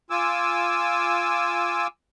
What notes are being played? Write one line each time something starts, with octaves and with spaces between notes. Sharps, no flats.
F4 G#5 D6 E6